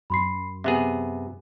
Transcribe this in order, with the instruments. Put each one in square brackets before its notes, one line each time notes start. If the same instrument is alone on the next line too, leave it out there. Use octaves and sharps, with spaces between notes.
[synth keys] F#2 [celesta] B5 C6 C7
[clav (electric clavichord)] C3 B3 G#4 [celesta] E5